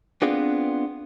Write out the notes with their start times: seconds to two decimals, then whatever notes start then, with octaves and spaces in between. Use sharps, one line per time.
0.22 B3 C4 D4 F4 G#4 B4